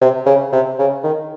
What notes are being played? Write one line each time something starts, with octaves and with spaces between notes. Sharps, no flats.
C3
C#3
C3
C#3
D#3